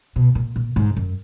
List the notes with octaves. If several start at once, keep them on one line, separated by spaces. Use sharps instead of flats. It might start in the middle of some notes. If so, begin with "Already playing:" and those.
B2
A#2
A#2
G#2
F#2